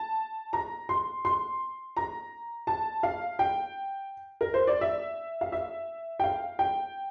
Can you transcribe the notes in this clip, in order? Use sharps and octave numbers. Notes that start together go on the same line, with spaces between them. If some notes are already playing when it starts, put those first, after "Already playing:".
Already playing: A5
A#5
C6
C6
A#5
A5
F5
G5
A#4
C5
D5
E5
F5
E5
G5
F5
G5